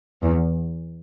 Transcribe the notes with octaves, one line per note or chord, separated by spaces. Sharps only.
E2